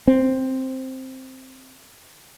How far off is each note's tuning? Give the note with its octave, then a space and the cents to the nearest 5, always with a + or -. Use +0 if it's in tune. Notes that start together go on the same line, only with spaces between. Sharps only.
C4 +5